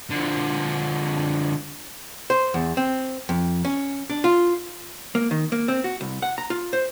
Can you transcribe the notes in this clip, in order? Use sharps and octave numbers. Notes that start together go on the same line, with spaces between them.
D3 F3
C5
E2
C4
F2
C#4
D4
F4
A#3
D#3
A#3
C4
F#4
C2
F#5
A#5
F4
C5